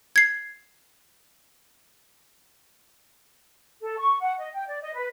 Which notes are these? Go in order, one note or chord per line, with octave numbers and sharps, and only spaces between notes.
G#6 C7
A4
C#6
F#5
D#5
G5
D5
D#5
B4